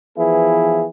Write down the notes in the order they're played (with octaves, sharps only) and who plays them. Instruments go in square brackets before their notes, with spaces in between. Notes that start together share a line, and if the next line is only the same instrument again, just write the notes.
[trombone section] E3 F3 B3 E4 G#4